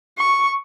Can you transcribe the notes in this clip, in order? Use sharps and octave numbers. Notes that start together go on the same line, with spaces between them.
C#6